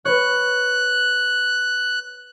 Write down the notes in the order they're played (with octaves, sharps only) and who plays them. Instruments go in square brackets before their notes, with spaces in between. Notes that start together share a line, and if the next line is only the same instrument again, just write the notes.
[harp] B4 C#5 [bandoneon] F#6